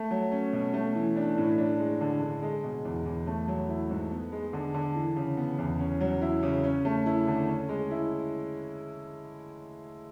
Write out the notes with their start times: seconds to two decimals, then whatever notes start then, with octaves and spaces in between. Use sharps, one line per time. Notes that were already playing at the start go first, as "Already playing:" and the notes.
Already playing: A3
0.11 F#3
0.32 C#4
0.53 B2
0.74 A3
0.95 E3
1.16 D4
1.38 A2
1.58 D4
1.79 G#3
2.01 D3
2.21 D3
2.42 G#3
2.64 B2
2.85 E2
3.06 E2
3.27 A3
3.48 F#3
3.69 E4
3.90 G#2
4.11 B3
4.32 G#3
4.53 D3
4.74 D3
4.95 E3
5.16 C#3
5.37 B3
5.58 E2
5.80 C#4
6.01 F#3
6.22 E4
6.43 C#3
6.64 C#4
6.85 A3
7.06 E4
7.27 D3
7.48 C#4
7.69 G#3
7.90 E4